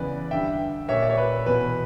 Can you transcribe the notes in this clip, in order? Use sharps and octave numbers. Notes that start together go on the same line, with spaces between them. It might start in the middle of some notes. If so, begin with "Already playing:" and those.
Already playing: E2 C#3 E3 B4 D5
G2 D3 E5 G5
A#2 C#5 E5
D5
C#5
B4
E2 B2 B4